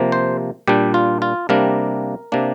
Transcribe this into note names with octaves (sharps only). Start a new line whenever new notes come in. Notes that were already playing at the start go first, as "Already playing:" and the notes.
Already playing: C3 F3 A#3
C5
A#2 G3 D4 G4
F4
F4
C3 G3 A#3 D4 A#4
C3 A#3 D4